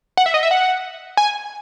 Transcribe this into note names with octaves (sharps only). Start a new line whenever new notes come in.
F#5
E5
D#5
E5
F#5
G#5